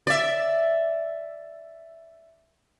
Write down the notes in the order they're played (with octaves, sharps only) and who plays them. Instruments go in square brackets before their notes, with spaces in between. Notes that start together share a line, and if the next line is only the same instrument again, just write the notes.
[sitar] D5 E5